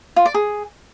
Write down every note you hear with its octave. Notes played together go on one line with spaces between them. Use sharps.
F4
D5
G#4